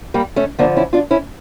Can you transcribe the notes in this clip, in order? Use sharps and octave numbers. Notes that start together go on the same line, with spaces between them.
G3 A#3
A3 C#4
G2 D3 F3 A#3 D4
C#4 E4
D4 F4
C#4 E4